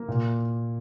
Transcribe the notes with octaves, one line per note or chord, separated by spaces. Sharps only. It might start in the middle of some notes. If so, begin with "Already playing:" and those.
Already playing: A#3
A#2